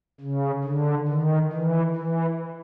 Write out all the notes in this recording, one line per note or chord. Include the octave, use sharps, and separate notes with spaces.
C#3
D3
D#3
E3
E3